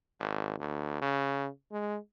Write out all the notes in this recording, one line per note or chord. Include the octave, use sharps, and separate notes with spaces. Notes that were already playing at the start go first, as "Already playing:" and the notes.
G#1
D2
C#3
G#3